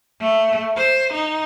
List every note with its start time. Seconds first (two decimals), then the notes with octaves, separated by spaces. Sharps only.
0.21 A3
0.77 C5
1.13 D#4